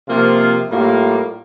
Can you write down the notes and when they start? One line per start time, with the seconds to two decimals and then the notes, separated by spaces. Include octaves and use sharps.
0.09 C3 F3 A#3 F4
0.69 A2 G3 A#3 F4